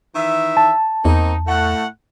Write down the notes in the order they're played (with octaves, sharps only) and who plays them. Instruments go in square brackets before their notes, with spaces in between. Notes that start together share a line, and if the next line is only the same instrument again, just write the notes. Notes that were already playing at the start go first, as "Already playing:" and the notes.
[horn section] D#3 E3 E5
[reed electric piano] A5
[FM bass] E2 [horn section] A#3 C4 D#4
[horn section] A2 A3 F#5